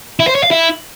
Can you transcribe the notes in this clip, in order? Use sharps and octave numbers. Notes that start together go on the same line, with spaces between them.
E4
C5
C#5
F5
E4